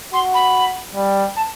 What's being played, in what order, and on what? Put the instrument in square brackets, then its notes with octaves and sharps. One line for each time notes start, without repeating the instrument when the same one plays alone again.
[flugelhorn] F#4 [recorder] C6
[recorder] B5
[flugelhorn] G3
[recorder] A5